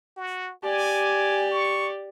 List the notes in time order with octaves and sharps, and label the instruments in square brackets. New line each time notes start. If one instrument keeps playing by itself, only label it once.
[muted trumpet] F#4
[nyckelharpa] G4 D5 [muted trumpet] G#5
[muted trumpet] C#6